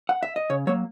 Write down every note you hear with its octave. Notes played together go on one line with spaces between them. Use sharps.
F#5
E5
D#5
C#3 C#5
F#3 A#3 C#5